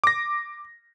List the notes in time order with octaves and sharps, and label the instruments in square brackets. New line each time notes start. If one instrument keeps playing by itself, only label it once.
[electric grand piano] D6 A#6